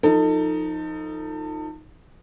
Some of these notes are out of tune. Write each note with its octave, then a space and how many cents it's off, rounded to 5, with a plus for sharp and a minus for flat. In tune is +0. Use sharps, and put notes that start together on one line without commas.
F3 +0 D#4 +0 A4 +30